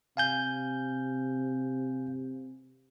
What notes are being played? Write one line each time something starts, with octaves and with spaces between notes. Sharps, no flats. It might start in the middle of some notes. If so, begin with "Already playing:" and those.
C3 F5 G#5 G6